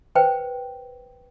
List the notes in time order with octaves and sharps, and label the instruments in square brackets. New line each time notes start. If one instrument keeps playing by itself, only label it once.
[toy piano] B4 C5 G5